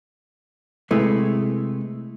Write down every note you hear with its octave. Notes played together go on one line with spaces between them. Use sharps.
C3 G#3 A3 E4 B4